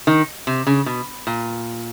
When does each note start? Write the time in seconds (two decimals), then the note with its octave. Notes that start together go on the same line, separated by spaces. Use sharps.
0.07 D#3
0.47 C3
0.67 C#3
0.86 B2
1.27 A#2